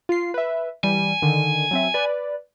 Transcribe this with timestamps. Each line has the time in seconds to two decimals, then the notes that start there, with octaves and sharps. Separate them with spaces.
0.09 F4 C7
0.34 B4 E5
0.84 E3 G3 G#5
1.22 D3 D#3
1.71 F#3 C4 E5
1.94 B4 D5